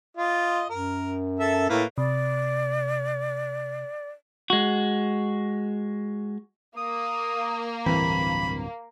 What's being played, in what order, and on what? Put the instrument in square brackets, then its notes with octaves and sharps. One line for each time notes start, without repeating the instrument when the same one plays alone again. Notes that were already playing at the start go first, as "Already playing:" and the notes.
[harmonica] F4 D#5
[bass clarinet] F#2 [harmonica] A#4
[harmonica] A4 E5
[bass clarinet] A2 [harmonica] A3 A#3 B4
[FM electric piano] C3 [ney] D5
[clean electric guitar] G#3 F#4
[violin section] A#3 [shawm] D#6
[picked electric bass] D1 G2 C4 [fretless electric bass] E3 [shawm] B5